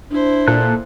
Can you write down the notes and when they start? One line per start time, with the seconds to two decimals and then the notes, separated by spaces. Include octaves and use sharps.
0.11 D4 E4 C5
0.48 A#2 A4 A5 F#6